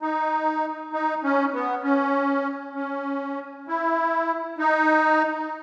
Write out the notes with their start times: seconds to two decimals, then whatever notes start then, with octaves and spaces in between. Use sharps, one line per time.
0.02 D#4
0.93 D#4
1.24 C#4
1.54 B3
1.84 C#4
2.76 C#4
3.68 E4
4.58 D#4